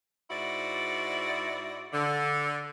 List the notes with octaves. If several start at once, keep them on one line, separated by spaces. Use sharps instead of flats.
G#2 E4 F#4 D5
D3